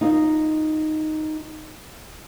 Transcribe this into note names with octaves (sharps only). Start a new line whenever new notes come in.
D#4 F4 D#5